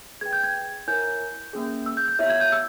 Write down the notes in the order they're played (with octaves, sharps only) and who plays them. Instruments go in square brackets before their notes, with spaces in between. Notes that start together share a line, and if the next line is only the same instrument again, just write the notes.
[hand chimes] G#4 B4 G5 [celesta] G#6
[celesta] G6
G#6
[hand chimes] E4 A#4 C#5 G#5 [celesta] G6
[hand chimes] A#3 C#4 G#4
[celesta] E6
G6
G6
[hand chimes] B3 E4 G4 C#5 E5 [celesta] G6
[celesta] G#6
G6
E6